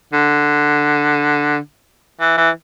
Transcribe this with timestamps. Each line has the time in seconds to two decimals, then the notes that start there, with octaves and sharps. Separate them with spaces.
0.13 D3
2.21 E3
2.38 E3